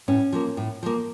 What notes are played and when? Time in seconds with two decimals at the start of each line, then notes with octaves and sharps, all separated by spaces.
0.08 A2 C#4
0.33 F3 A#3
0.57 A2
0.83 F3 A#3